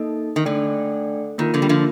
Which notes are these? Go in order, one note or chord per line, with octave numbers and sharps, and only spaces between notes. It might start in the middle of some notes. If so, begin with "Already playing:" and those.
Already playing: A#3 D#4 A4 D#5
D#3
D3 A3 D4 A4 D5 G5
D#3 A#3 F4 A#4
D3 F3
G3
D3 F3